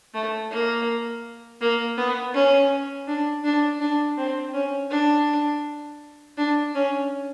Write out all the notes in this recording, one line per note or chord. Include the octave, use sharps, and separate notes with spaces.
A3
A#3
A#3
B3
C#4
D4
D4
D4
C4
C#4
D4
D4
C#4